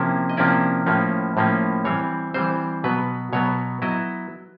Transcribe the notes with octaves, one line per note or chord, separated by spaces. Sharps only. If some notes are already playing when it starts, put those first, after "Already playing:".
Already playing: C3 F3 A#3 C#4 E4
D#5
C3 F3 A#3 C#4 E4 D5
A2 F3 A#3 C#4
A2 F3 A#3 C#4
E3 G3 C4 C#5
E3 G3 C4 C5
B2 F#3 B3 B4
B2 F#3 B3 C#5
F#3 B3 E4 D#5